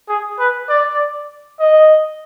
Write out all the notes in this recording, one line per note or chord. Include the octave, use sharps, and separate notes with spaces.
G#4
B4
D5
D#5